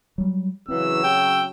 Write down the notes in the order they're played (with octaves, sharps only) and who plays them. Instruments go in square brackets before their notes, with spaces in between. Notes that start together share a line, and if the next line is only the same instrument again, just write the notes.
[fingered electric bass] F#3 G3
[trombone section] C#3 F#3 [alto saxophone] E3 [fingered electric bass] C4 [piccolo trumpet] E6
[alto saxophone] G5